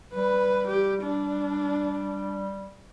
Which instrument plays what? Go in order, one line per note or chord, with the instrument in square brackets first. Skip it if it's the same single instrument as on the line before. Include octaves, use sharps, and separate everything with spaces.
[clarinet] G3 [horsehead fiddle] B4
[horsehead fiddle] G4
D4